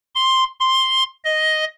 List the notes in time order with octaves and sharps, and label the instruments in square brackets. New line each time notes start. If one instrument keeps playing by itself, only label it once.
[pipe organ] C6
C6
D#5